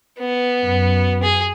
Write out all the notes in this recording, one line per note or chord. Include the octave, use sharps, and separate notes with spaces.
B3
F#2
G#4